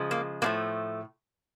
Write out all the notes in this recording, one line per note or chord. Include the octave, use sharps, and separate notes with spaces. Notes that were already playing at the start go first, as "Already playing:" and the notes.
Already playing: C#3 F3 G#3
A#3
A2 F3 A3 A#3